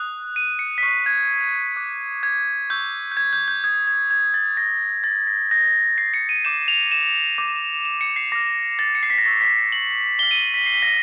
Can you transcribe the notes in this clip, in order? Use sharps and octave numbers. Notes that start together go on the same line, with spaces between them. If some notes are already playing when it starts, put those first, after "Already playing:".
Already playing: D#6 F#6
D#7
C#7
B6
C#6 F6 C7
G#6
D6 F#6
G#6
C#6 E6 G6
G6
G#6
G6
G6
D#6 G6 G#6
G#6
G#6
A6
D#6 G6 A#6
A6
A#6
D#6 G6 A#6
C7
C#7
D#7
D6 G6 E7
F7
E7
D6 G6
E7
C#7
C7
D6 F6 A#6
A6
C#7
C7
B6
A#6
C#6 E6 G6 A6
B6
F#7
D6 F6 G7
D#7
D#7
B6
C7
B6
A#6